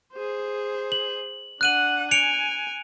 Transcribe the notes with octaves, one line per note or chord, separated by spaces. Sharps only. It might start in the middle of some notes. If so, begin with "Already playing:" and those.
G#4 C5
F#7
D4 F#5 F#6 D#7 F#7
G#5 C#7 D7 F7